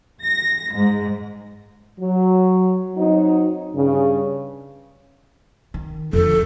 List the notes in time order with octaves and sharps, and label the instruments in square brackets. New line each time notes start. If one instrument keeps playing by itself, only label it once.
[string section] A#6
G#2
[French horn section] F#3
F#3 C4 D#4
G2 C#3
[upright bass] D#3
[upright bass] F2 D3 [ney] A4